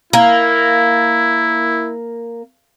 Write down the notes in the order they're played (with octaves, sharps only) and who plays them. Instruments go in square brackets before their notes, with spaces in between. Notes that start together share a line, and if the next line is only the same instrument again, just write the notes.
[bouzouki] A#3 [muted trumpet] E4